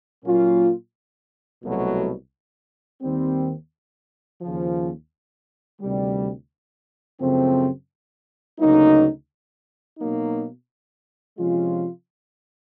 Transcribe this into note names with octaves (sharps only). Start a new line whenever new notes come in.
A#2 F#3 A#3 C#4 F4
C2 B2 F#3 A3
D#2 D#3 G3 C4
D#2 C#3 F3
D2 C3 D#3 G3
F#2 C#3 F3 A3 C4
D2 C#3 F#3 A#3 D#4
B2 F#3 A#3 D#4
C3 F3 G#3 C#4 F4